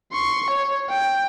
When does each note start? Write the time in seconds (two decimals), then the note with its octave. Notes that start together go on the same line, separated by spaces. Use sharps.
0.12 C6 C#6
0.50 C#5
0.89 G5